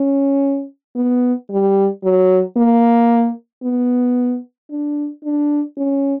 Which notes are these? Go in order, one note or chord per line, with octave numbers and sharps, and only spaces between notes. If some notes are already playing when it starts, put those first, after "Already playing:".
Already playing: C#4
B3
G3
F#3
A#3
B3
D4
D4
C#4